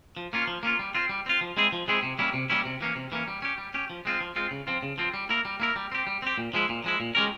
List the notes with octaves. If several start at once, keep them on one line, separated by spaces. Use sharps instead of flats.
F3
A#3 C#4 F4
F3
A#3 C#4 F4
G3
C4 F4
G3
C4 F4
F3
G#3 C4 E4 G#4
F3
G#3 C4 E4 G#4
C3
G3 A#3 C#4 E4
C3
G3 A#3 C#4 E4
C3
E3 A#3 C#4
C3
E3 A#3 C#4
G3
C#4 G4
G3
C#4 G4
F3
G#3 C4 F4
F3
G#3 C4 F4
C#3
F3 C4 F4
C#3
F3 C4 F4
G3
A#3 E4 A#4
G3
A#3 E4 A#4
G3
C4 G4
G3
C4 G4
A#2
F3 G#3 E4
A#2
F3 G#3 E4
A#2
G#3 C#4 G4 A#4